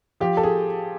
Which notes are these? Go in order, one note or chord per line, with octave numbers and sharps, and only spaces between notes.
F3 G4
A4
G#4